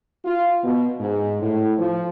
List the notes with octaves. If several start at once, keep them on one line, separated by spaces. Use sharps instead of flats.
F4
B2
G#2
A2
F3